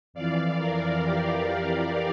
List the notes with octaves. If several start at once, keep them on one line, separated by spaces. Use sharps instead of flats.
F2 E3 D5 F5
A#4 D5
G4 A#4